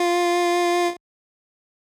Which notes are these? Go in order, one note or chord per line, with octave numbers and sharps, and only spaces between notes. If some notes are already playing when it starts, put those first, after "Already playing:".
Already playing: F4